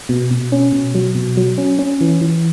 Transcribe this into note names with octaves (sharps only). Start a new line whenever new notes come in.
B2
B2
C#4
B2
F#3
B2
F#3
C#4
C#4
E3
E3